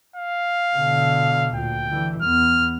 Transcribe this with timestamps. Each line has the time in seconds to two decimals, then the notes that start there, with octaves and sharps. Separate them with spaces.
0.16 F5
0.74 B2 D3
1.55 D2 A#2 G5
1.89 D3 E3
2.22 E2 B3 F6